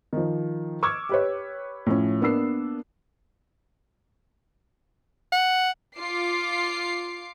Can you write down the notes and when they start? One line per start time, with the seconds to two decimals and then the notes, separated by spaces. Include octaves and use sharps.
0.13 D#3 F3
0.83 C#6 D6 E6 F6 G#6
1.09 G4 B4 C#5
1.86 A2 F3 C#4
2.21 A#3 B3 D4 E6 C7
5.32 F#5
5.96 F4 D6 C7